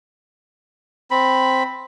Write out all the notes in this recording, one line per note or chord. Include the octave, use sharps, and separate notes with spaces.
C4 B5